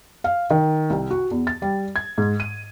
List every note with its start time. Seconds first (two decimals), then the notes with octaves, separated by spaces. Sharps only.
0.24 F5
0.50 D#3
0.90 C2
1.11 F#4
1.31 E2
1.47 A6
1.62 G3
1.96 G#6
2.18 G#2
2.40 D#7